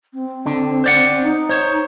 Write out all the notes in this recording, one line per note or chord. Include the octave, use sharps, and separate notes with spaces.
C4
D3
C5 D5 F#5
D#4
C5 C#5